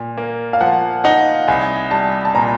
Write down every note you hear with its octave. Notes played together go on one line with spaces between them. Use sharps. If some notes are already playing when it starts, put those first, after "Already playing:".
Already playing: A#2
A#3
F5
F3 F#5
D#4 F#5
C2 G#5
G3 A5
A5
A#2 A#5